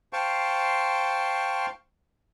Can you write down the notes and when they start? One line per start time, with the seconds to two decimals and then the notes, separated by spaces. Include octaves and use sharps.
0.13 C5 F5 G5 A5 C6 C#6